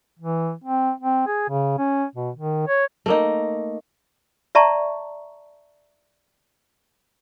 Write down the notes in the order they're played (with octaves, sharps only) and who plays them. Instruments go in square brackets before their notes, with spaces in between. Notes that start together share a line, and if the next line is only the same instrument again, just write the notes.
[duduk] E3
C4
C4
G#4
C#3
C#4
B2
D#3
C#5
[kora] A3 A#3 D#4
[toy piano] D5 E5 A5 A#5 C#6